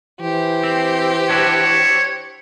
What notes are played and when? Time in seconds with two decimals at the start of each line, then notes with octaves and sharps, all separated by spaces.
0.20 E3 G4 C5
0.64 C4
1.30 D4 E4 F#4 C#5